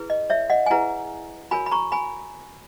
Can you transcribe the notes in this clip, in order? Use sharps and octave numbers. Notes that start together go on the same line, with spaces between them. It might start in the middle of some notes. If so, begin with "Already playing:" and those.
Already playing: E4 G#4 B4
D#5
C#5 E5
D#5 F#5
G#5
E4 G#4 B4 F#5 A#5
F#4 A#4 C#5 G#5 B5
B5
A#5 C#6
G#5 B5